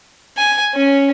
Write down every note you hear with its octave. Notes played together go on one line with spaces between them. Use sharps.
G#5
C#4